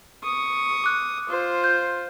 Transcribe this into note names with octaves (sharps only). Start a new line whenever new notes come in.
C#6 D#6
D6 F#6
F4 C5
G6